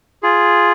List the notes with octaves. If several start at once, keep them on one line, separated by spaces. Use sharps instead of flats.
F4 G#4